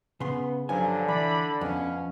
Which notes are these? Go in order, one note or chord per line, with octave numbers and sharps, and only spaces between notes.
C#3 B3 C6
G2 D3 F3 F#3 G#5
E3 D5 B5
F2 B2 C#4